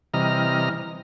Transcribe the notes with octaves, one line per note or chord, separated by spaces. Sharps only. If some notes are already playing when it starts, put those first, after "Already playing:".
C3 E3 G3 D#5 A#5 F6